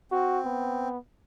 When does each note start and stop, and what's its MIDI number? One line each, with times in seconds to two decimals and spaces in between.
0.12 0.88 60
0.12 0.40 66
0.45 0.98 59